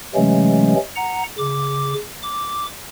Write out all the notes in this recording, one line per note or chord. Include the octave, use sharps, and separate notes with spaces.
C3 E3 F#3 G#3 A3 C#4
F#5 A#5
C#3 D6
D6